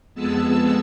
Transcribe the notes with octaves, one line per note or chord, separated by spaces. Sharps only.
F2 G#3 B3 G#4 A5 E6